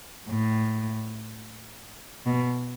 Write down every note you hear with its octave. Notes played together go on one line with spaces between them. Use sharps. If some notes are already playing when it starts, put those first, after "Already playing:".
A2
B2